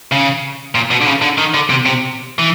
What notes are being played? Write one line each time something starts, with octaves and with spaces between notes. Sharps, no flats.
C#3
A#2
B2
D3
C#3
D3
D#3
D3
C3
C3
E3